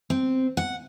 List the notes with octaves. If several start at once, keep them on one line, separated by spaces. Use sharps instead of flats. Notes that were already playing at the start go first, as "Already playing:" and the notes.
C4
F#5